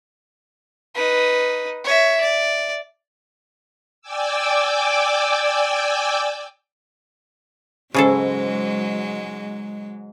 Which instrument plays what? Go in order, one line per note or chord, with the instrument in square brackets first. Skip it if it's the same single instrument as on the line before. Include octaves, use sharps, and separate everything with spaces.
[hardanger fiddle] D#4 B4
C#5 E5
D5
[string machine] D5 G5 G#5 D6 E6
[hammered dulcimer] G#2 [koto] C#3 G#4 A4 [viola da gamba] F#3 G#3